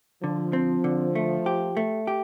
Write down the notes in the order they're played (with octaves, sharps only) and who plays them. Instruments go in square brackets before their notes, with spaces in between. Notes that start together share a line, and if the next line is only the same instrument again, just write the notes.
[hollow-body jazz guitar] D3 [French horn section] F3
[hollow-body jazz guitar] C4
D3
A3
G4
A3
G4